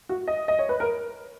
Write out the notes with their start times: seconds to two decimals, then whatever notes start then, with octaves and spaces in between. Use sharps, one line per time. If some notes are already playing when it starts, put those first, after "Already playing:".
0.09 F#4
0.28 D#5
0.48 D#5
0.59 C#5
0.69 B4
0.80 A#4